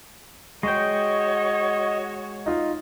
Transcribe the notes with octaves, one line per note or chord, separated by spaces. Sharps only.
G#3 F#4 C#5 D#5 G5 C#6
D#4 F4